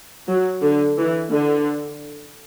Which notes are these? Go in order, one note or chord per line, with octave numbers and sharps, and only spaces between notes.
F#3
D3
E3
D3